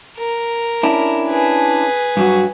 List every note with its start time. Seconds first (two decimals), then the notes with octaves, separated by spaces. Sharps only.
0.17 A#4
0.83 C#4 D4 E4
1.29 G#4 B4
2.17 G2 F#3 F#4